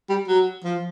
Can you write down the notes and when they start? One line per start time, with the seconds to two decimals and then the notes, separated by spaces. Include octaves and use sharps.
0.09 G3
0.27 F#3
0.64 F3